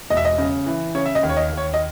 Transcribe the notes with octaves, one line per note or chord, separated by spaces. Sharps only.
E1 D#5
E5
D#5
C#3
E3
C#3 C#5
E5
D#5
D#2
C#5
D#5
D#2
C#5
D#5